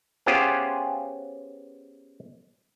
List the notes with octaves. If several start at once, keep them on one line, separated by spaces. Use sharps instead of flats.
B3 C#4 F4 G4 G#4 C5